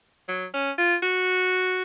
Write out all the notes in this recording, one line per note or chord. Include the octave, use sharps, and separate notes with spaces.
F#3
C#4
F4
F#4